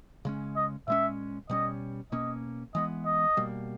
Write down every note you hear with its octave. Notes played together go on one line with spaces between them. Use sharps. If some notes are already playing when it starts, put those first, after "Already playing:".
C#3 G#3 C#4
D#5
A#2 G#3 C#4 E5
B2 G3 C#4 D#5
B2 A#3 C#4 D#5
E3 G#3 B3 D#5
D#5
B2 G3 A#3